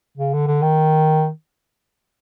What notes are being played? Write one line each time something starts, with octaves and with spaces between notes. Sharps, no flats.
C#3
D3
D3
D#3